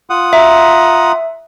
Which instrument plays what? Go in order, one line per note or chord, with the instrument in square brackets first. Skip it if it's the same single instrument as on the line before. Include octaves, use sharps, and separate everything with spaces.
[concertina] F4 F#5 D#6
[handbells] E5 [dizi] A#5